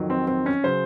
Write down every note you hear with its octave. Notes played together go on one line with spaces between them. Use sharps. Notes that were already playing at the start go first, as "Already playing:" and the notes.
Already playing: F2 D#3 F#3
C4
C4
C#4
C#3 F#3 C5